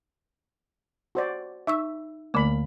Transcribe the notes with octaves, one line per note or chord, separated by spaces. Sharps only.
F#4 C5 D5
D#4 E5 C#6 E6
D2 D3 A3 A#3 B5